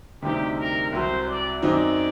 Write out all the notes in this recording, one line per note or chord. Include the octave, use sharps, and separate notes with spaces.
D2 C3 G3 C4 D#4 G4
A#4
C2 C3 F#3 C5
D5
F#2 F#3 C4 D#4 D5